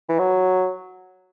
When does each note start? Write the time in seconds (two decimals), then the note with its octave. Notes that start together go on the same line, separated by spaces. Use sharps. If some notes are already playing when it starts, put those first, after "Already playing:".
0.09 E3
0.19 F#3